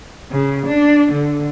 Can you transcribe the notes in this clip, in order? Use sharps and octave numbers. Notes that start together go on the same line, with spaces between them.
C#3
D4
D3